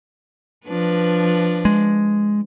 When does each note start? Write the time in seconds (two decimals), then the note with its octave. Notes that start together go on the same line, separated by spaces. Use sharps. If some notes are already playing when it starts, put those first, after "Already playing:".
0.67 F3 D4 B4
1.65 G#3